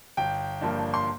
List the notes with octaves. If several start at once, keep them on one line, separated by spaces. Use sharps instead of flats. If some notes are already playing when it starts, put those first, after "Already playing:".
G1 G5
G2 F3 A#3 D4
C6